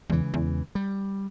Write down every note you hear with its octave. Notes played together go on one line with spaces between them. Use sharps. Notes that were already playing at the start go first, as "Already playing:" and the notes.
E2 C#3 E3 G#3
E2
G3